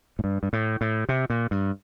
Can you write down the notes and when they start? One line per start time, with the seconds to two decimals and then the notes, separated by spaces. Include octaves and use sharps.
0.19 A2
0.24 G2
0.43 G2
0.53 A2
0.81 A2
1.09 C3
1.30 A#2
1.51 G2